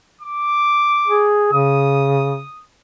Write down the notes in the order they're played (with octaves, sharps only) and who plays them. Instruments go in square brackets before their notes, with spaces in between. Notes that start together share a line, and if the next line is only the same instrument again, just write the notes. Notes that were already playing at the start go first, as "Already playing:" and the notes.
[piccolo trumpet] D6
[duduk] G#4
[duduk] C#3 [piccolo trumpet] D#6